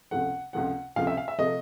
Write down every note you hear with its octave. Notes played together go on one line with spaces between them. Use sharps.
C#2 C3 F3 A3 F#5
C#2 C3 F3 A3 F#5
C#2 C3 F3 A3 F5
E5
F5
E5
C3 F3 A3 D#5